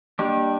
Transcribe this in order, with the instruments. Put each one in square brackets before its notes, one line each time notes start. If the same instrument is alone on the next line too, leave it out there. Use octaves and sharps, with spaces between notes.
[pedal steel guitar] G3 D4 G4 [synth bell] A#3